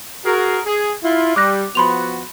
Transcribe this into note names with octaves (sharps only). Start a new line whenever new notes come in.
F#4 G#4 A#4
G#4
E4 F4
G3 D6 F#6 A#6
F3 B3 F#4 B5 C6 F7